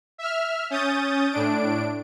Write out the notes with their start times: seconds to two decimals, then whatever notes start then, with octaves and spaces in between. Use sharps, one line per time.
0.18 E5 F6
0.70 C#4 D#6 G6 A6
1.31 A2 D4 D7